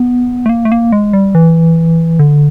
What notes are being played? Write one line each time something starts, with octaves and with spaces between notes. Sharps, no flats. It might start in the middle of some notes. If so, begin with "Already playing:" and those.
Already playing: B3
A3
A#3
A3
A#3
G#3
G3
E3
D3